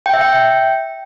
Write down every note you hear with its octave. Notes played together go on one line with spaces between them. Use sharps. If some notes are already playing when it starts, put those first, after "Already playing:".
G5
E5
G5